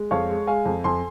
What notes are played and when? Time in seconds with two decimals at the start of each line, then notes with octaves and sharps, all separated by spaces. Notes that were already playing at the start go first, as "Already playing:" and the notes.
Already playing: G#3
0.11 F2 C#5 F5
0.29 G#3
0.47 G#3 F5 G#5
0.65 F2
0.84 F2 G#5 C6